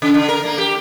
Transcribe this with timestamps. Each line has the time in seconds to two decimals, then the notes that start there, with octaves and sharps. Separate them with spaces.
0.02 C#3
0.14 D3
0.28 A#4
0.45 A#3
0.58 G4